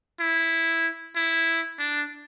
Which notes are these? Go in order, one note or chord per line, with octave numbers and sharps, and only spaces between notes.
E4
E4
D4